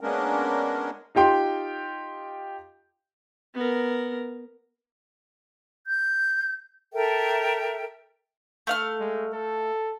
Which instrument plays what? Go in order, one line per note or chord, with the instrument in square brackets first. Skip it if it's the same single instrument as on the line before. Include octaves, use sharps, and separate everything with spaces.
[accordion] G#3 A#3 B3 C#4 D4 A#4
[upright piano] D#4 F4 G4 G5 C6
[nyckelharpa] B3 A#4
[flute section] G6
A4 A#4 E5 G5
[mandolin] A3 F5 F6
[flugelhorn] G#3
A4